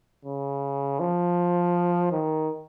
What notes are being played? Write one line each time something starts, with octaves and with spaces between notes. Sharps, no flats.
C#3
F3
D#3